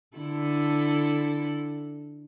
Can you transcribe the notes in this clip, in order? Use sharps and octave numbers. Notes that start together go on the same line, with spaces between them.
D3 E4 A4